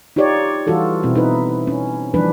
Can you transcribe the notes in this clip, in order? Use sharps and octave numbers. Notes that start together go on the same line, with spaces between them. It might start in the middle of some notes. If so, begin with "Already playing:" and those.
D#4 F4 G4 C#5 D5
E3 G3 F4 F#4 A4
B2 C4 E4
D#4 E4 B4
C#4
E3 F3 G3 D4 B4